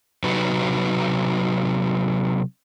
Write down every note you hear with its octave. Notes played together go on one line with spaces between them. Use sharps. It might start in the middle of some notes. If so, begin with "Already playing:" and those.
C3 F#3 D#4 F#4 B4